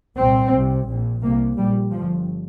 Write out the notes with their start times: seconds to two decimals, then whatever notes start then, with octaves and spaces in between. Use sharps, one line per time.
0.18 C2 A#2 C4
0.53 C2 C3
0.88 A#1 A#2
1.22 C2 C3 A#3
1.57 A#1 A#2 G3
1.92 G1 G2 F3